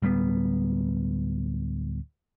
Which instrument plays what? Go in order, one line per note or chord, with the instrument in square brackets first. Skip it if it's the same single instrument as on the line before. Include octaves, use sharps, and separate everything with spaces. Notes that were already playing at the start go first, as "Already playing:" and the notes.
[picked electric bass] D1 G3 A#3 B3